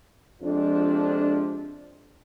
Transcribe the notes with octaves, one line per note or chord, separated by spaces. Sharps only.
F2 C3 F3 G#3 D4